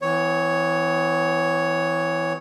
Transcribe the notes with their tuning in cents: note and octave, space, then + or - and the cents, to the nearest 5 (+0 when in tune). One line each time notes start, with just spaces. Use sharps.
E3 +0 B3 +45 C#5 +0